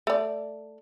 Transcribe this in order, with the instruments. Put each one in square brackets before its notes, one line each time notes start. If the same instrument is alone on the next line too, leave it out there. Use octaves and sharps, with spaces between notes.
[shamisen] A3 D5